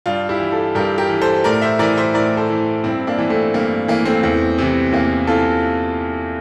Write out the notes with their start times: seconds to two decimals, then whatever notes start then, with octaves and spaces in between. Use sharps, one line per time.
0.06 G2 D4 F4
0.29 E4 G4
0.40 E3
0.51 F4 A4
0.75 G2 G4 A#4
0.98 G4 A#4
1.10 E3
1.21 A4 C5
1.44 A2 A#4 D5
1.62 C5 E5
1.79 E3 A#4 D5
1.97 C5 E5
2.14 A2 A#4 D5
2.37 A4 C5
2.50 E3
2.84 G2 C4 E4
3.07 A#3 D4
3.18 E3
3.30 A3 C4
3.54 G2 A#3
3.88 E3 A#3
4.05 A3 C4
4.23 E2
4.58 C3 E3
4.92 E2 A#3
5.27 C3 E3 F4 A4